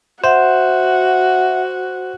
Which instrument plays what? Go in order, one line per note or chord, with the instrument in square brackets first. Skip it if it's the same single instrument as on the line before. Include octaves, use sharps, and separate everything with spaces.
[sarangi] F#4 [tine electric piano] C5 [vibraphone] E5 F#5